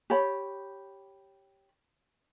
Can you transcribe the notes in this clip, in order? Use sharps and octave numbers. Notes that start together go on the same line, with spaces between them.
G4 C#5 B5